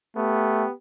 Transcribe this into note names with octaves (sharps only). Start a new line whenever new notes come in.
A3 B3 G4